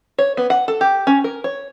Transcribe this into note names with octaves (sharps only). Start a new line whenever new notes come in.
C#5
B3
F#5
A4
G4
C#4
A#4
C#5